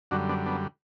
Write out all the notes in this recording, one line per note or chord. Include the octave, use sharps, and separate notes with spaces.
F#2 D3 G3 D4 F#4
B3 D4
B3 D4